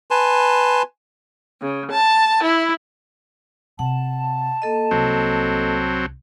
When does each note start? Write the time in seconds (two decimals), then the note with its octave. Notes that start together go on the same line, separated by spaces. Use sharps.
0.11 B4 G#5 A5 C6
1.61 C#3
1.90 A5
2.42 E4
3.79 C3 F#5 A5
4.62 A#3 A4 D#5
4.91 C2 F#3 C4